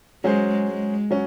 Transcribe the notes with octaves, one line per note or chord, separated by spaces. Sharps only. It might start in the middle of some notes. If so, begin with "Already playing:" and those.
F#3 G#3 C#4 G#4 C5
G#3
F#3 C#4